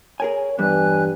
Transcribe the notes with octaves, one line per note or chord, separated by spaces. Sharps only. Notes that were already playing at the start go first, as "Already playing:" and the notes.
G#4 A#4 C#5 G#5
E2 G2 G3 G#5 F#6